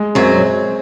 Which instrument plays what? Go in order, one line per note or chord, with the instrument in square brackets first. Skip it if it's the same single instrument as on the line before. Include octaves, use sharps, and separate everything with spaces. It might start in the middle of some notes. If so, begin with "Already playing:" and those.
Already playing: [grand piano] G#3
[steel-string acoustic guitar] F#2 F#3 [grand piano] C4